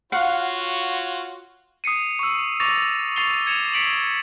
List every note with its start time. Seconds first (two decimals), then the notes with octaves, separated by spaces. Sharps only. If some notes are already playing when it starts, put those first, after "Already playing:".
0.12 F4 F#4 C#5 F5 F#5
1.84 D#6 C7 C#7 D#7
2.19 C#6 E6
2.60 C#6 D6 A6 A#6 D#7 F7
3.16 C#6 A6 C7 F7 G7
3.47 G#6 C#7 E7 F7
3.74 B6 C#7 D7 F7 F#7